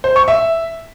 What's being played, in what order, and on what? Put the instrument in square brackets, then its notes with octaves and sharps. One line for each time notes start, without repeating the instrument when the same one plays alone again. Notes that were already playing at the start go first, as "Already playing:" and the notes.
[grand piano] C5
C#6
E5